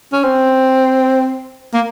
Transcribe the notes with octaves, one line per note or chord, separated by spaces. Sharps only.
C#4
C4
A#3